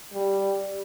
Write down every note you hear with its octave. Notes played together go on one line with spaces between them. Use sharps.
G3